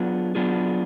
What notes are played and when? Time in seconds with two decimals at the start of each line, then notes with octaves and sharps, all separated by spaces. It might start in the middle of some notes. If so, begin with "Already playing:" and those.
Already playing: F#3 B3 D4 F4 G#4
0.35 F#3 B3 D4 F4 G#4